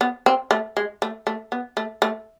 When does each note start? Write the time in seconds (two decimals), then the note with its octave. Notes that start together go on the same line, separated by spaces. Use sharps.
0.01 B3
0.26 C4
0.51 A3
0.77 G#3
1.02 A3
1.27 A3
1.52 B3
1.77 A3
2.02 A3